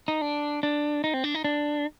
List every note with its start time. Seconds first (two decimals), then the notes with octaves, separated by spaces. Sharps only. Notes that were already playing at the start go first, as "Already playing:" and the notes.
0.08 D#4
0.21 D4
0.63 D4
1.04 D#4
1.14 C4
1.24 D4
1.35 D#4
1.44 D4